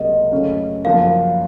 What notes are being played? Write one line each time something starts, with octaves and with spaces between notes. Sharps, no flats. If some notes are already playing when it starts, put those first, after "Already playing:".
Already playing: C#2 C3 F#3 A#3 D#5
F#2 C#3 A3 C#4
F#1 F#2 F3 A#3 F5